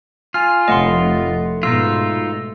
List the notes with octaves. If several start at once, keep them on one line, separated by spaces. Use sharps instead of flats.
F4 G#5 F6
F1 A2 D#5 F#5 C6
G#2 B2 D#4 F4 E6